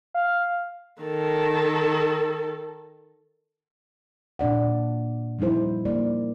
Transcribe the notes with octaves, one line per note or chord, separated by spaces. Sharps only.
F5
D#3 A4
A#2 D4 D5 F#5
F3 G3 D#4 E4 C5
A#3 D5